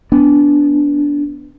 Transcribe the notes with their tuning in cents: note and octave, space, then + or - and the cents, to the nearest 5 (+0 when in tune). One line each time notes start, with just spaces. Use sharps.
B3 +0 D4 -15